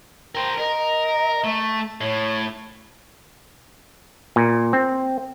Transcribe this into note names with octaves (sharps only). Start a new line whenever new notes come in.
A#4 C5 G5
A#4 D#5
A3
A2 C#5
A#2
C4